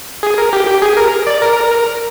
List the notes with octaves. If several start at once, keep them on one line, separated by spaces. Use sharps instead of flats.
G#4
A#4
G4
G4
G#4
A#4
D5
A#4